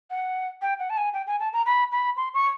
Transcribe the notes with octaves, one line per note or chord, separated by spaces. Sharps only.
F#5
G5
F#5
A5
G#5
G5
G#5
A5
A#5
B5
B5
C6
C#6